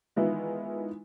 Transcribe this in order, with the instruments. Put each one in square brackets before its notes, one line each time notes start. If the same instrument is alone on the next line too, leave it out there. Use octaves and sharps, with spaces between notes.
[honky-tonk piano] D#3 E3 G#3 B3 E4 F4